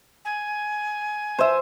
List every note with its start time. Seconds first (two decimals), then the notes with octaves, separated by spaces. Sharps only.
0.24 G#5
1.39 C5 E5